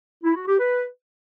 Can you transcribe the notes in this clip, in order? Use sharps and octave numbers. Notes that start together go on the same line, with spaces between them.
E4
F#4
G4
B4